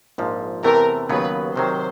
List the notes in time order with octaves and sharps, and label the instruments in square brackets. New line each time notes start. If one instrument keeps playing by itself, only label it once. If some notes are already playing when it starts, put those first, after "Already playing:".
[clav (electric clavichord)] A#1 G#2 F3
[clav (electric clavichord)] E2 C3 E3 A3 [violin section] A#4
[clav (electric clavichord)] D#2 C#3 F#3 B3 [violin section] B4
[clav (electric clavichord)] C3 D#3 F#3 [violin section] C5